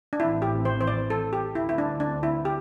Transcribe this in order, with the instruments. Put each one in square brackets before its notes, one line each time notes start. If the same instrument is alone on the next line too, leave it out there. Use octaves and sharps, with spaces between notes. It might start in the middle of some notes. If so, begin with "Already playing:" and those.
[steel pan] D4
[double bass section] A1 A2 E3 C4 [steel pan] E4
[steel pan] G4
C5
C5
D5
A4
G4
[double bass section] D2 D3 C4 [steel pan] E4
[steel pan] E4
D4
D4
E4
G4